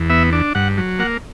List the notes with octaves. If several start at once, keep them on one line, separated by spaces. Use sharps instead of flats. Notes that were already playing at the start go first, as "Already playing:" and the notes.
Already playing: E2
B3 E5
D4
G2 F#5
F#3
A#3 F#5